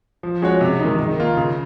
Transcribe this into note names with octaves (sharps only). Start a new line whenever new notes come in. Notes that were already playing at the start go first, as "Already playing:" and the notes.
F3
G#3 C#4 F#4 C#5
C3
D#3 G#3 D#4
D#3
A#3 F4
C#3